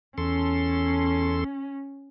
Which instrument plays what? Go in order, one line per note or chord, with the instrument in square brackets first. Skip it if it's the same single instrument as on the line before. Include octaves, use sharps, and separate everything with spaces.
[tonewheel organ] E2 A4 C6 [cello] C#4